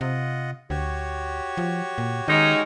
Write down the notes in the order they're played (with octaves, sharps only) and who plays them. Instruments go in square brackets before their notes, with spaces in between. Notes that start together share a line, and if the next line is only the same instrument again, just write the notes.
[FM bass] C3 [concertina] F4 D#5 F#5
[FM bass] D2 [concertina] F#4 G4 C#5
[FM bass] F3
A#2
[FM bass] D#3 [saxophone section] G#3 C#4 D#4